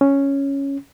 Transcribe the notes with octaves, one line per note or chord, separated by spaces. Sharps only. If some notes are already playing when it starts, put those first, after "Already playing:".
C#4